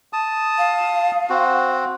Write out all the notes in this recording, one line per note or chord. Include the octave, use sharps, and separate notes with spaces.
A5 D#6
F5
C4 F#4